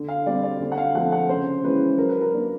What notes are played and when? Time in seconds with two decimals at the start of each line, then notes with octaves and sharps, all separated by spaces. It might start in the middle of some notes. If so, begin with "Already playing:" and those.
Already playing: D3
0.08 F5
0.26 G3 C4 D5
0.43 D5
0.60 D3
0.72 F#5
0.78 F5
0.94 F3 A3 C4 F#5
1.12 F#5
1.29 C#3 C5
1.64 E3 G#3 C#4 B4
1.98 F#3 A#4
2.09 B4
2.21 A#4
2.33 A#3 D4